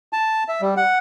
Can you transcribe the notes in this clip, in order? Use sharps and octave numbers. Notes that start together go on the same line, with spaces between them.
A5
E5
G3
F#5